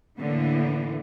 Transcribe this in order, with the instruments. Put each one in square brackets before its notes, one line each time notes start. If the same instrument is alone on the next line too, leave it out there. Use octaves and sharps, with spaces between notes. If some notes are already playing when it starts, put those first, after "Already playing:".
[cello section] A2 D3 E3 A#3